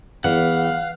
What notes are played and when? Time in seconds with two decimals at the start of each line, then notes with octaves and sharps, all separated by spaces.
0.24 E2 E3 F5 F#5